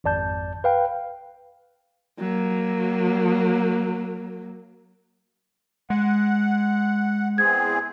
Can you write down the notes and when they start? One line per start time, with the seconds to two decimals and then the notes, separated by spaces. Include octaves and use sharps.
0.04 G#1 F2 D5 A5 G6
0.64 B4 F5 G5
2.20 F#3 A#3
5.90 G#3 F#5
7.38 E2 C4 G#4 G#6